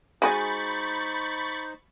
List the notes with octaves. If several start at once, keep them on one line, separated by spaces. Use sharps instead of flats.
G#3 D#4 F#4 C5 G#5 B5 C#6 A6